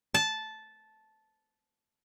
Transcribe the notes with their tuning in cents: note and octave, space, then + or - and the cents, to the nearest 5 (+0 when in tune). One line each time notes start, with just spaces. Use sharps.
A5 -10